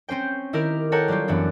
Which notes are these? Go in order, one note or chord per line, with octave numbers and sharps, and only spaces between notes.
C4 C#4 C5 G5
D#3 E4 G4 A#4 F6 D7
A4 A#4 C#5 F#5 G5 A#5
F#3 G3 A#3 F4 G4
F#2 E3 B3 D4